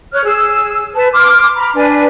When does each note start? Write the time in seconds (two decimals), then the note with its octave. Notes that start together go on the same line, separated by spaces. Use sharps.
0.13 C#5 F6 F#6
0.25 G#4 E6
0.95 B4 A5
1.13 C6 D6 F6
1.56 A#5 B5
1.75 D4 B4 G#5